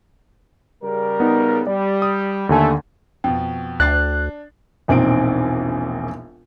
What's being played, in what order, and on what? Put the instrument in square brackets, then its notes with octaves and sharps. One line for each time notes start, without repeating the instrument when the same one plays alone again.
[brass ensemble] C#3 G3 A#4
[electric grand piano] B3 D#4
[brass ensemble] G3 [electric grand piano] D5
[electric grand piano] D#6
[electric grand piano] D#2 D3 G#5 [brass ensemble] A3
[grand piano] F2 B2 [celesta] G5
[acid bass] D2 [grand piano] D4 A6 C7 [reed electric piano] F#6
[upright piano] E1 A#1 C4 D#4 D7